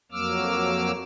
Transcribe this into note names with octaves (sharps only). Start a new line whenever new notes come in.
F2 F#3 A#3 D6 E6 F6